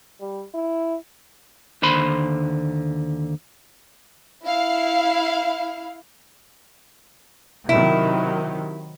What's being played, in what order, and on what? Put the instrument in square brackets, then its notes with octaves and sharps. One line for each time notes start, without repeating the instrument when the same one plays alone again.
[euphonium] G3
E4
[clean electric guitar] D#2 D3 C5 B5 C6
[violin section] E4 F5
[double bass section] C3 D#3 F#3 [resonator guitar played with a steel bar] E4